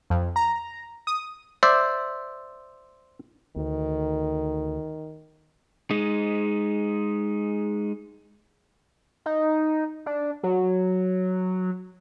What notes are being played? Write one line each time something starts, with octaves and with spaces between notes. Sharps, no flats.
F2
A#5
D#6
C5 D5 E5
D2 D#3
G#3 D#4
D#4
D4
F#3